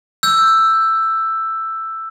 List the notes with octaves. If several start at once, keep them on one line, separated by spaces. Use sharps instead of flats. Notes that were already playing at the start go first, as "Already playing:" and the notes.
E6 G6